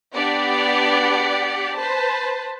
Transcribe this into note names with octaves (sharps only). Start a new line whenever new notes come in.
B3 D4 G4 D5 F#5
B4 C5 A5